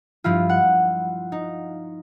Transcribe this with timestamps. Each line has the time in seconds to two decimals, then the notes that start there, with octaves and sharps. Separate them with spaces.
0.24 G2 F3 E4 F4
0.49 F#5
1.32 D#4